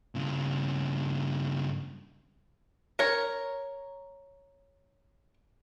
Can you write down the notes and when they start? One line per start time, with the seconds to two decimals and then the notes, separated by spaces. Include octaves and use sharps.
0.15 G2 C#3
2.99 A#4 C#5